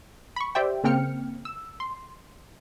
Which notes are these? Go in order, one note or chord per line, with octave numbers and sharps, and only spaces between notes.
B5 C#6
G4 C5 D5 E5 G5
C#3 A#3 C4 G5 F6 C#7
E6
C6